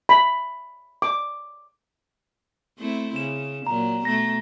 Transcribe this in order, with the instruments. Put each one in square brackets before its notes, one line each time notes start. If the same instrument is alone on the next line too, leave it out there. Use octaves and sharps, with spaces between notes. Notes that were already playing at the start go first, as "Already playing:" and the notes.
[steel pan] B5
D6
[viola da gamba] A3 C4 E4
[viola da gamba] C#3 [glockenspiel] E7
[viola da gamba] A#2 F#3 [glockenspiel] A#5
[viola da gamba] B2 A3 [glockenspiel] A#6